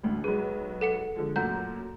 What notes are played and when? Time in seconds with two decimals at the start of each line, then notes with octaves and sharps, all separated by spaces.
0.03 A1 D2 A2
0.24 B1 G#3 G#4 B4
0.81 A4 F#5 C#7
1.15 D3 F3 G#3
1.36 F#2 A#2 A3 F#5 A#5 G6